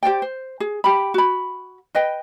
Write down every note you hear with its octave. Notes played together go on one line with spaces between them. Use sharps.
G4 C5 D5 G5
C5
G#4
G4 B5
F#4 B5
B4 D#5 G5